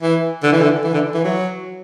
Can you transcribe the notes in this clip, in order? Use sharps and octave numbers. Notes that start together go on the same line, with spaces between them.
E3
D3
E3
D3
E3
D3
E3
F#3